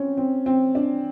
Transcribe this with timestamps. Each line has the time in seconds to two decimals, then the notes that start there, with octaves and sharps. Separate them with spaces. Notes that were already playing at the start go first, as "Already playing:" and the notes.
Already playing: C4 C#4
0.17 C4
0.46 C4
0.75 D4